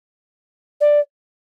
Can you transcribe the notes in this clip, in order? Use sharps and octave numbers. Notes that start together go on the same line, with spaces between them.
D5